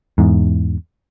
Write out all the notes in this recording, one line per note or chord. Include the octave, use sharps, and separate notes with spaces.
E2 G#2